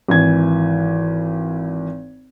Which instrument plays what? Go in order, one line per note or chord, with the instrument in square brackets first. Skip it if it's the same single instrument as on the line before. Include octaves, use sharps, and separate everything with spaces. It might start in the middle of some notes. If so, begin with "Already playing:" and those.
[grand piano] G#1 E3 G#6